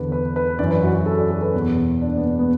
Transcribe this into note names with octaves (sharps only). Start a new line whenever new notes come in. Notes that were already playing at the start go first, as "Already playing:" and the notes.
Already playing: E2 D3 B4 D5
B4
B4
F#2 E3 D5
B4
F#4
F#4
A4
D5
A4
B4
E2 B2
D4
D4
B3
B3